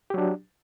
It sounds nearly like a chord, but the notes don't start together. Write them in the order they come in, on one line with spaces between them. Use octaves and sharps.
G4 F#3 D4